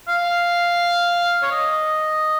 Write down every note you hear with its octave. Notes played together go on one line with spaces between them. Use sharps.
F5
C#5
D#5